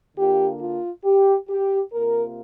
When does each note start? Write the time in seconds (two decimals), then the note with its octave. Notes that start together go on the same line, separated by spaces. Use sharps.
0.17 D3 A#3 D4 F4 G4
0.61 F4
1.04 G4
1.49 G4
1.93 C3 A#3 F4 A#4